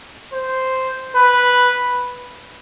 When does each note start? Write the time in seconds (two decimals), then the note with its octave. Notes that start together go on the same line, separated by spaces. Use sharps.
0.34 C5
1.16 B4